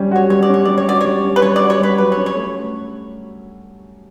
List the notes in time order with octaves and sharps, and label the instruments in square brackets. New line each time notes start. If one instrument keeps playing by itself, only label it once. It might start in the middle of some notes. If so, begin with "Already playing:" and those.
Already playing: [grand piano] G3 C#4
[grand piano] F#4 [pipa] C#5
[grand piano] G3 [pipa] C#5
[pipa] D5
[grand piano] C#4 [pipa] C#5
[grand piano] G3 [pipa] D5
[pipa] C#5
[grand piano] F#4 [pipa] D5
[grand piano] G3 [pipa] C#5
[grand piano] C#4
[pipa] B4
[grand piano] G3 [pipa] C#5
[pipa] D5
[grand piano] F#4
[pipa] C#5
[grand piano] G3 [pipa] B4
[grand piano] F#3 [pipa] B4
[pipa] C#5
[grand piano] C#4
[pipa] C#5
[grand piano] A3